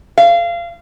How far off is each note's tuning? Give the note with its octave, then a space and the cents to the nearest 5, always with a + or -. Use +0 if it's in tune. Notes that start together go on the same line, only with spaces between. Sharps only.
F5 -25